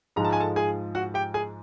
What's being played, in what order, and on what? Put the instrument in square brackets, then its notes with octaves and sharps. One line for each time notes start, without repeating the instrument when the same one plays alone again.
[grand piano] G#2 F3 G#3 [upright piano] A#5
[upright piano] A5
G#5
A4 A5
G#4 G#5
F#4 F#5
G4 G5
G#4 G#5